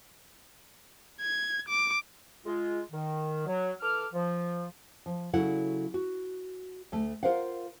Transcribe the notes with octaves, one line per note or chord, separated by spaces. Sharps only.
G#6
D6
G#3 F4
D#3
F#3
E3 A4 D6 F6
F3
F3
C#3 F#3 E4 A4 F#5
F#4
D2 A3
F4 F#4 A#4 C5 F5 F#5